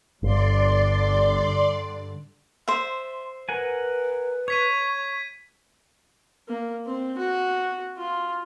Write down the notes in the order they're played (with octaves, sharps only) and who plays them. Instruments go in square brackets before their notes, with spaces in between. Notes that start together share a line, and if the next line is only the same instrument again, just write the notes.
[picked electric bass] G1 [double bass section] G2 D3 [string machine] D5 C6
[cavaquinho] C5 E5 [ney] C6
[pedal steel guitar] A#4 F#5 G#5 [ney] B4
[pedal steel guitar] C#5 [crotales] G#6 B6 D#7
[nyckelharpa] A#3
C4
F#4
F4